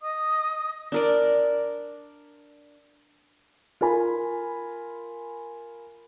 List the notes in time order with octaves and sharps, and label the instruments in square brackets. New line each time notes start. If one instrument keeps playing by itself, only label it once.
[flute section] D#5 D#6
[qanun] D4 A#4 D5
[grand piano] F4 A#4 G#5 B5